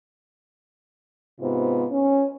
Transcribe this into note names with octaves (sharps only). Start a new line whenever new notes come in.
G#2 C3 B3 F4
C#4